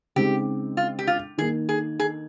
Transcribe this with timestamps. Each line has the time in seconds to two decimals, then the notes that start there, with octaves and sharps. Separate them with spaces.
0.16 C#3 G#3 C4 D#4 G4
0.77 F4
0.99 G4
1.07 F4
1.38 D#3 A#3 D#4 G#4
1.69 G#4
2.00 G#4